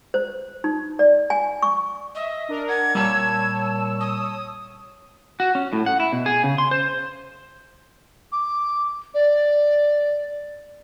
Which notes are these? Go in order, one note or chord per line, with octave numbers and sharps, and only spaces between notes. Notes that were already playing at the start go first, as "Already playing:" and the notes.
C5
D#4
D5
G#5
C#6
D#5 E5
D4 A#4
F#5 G#6
A#2 G3 C#5 A5 E6
D#6
F#4
C#4
A2
F#5
E4
B2
G#4
C#3
C6
C5
D6
D5